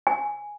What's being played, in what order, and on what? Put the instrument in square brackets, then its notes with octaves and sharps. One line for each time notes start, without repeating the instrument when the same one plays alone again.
[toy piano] G#5